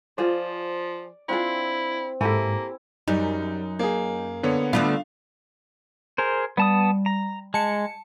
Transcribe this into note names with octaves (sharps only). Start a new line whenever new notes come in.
F3 F4 G#4 C5 D5
C4 D4 E4 F4 G#4
G#2 A#3 E4 G4 A4 G#5
F#2 G3 D#4
A#3 G#4
D3 B3 C#5
D3 A3 B3 D4 F4 F5
G#4 A#4 C5
G3 B3 A5 D#6
A#5
G#3 A5 C#7